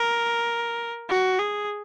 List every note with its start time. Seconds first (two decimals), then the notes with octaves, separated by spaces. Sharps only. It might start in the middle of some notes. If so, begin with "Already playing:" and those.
Already playing: A#4
1.09 F#4
1.39 G#4